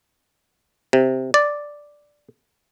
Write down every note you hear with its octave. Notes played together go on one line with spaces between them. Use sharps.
C3
D5